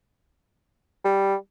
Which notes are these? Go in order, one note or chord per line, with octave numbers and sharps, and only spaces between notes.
G3